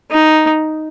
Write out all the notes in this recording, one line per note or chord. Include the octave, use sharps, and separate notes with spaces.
D#4